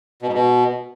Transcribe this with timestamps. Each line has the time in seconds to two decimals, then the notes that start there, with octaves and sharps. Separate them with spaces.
0.22 B2
0.28 G#2
0.33 B2